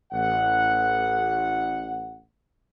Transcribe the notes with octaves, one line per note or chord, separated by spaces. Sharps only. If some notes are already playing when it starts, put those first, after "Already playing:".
A1 F#5